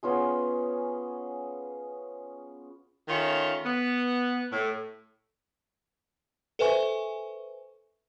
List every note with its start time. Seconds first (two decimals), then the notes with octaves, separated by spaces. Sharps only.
0.03 B3 C#4 F4 G#4
3.09 D#3 A3 C#4 F4
3.64 B3
4.53 A2
6.59 A4 B4 C5 E5 G#5 C#6